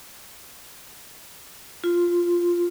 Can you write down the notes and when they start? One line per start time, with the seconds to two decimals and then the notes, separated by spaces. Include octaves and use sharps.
1.84 F4